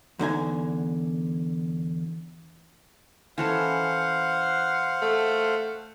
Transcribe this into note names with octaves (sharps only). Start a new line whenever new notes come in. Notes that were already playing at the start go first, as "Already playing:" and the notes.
E2 D3 D#4 G#5
E3 C#4 A4 C5 F5 F#5
A3